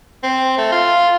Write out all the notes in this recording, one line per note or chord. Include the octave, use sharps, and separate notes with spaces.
C4
A3
F4